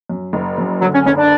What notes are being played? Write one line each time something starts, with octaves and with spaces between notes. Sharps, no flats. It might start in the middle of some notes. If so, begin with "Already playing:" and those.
F#2
F#1
F#2
D3 F#3
C#4
F#1 C#4
D4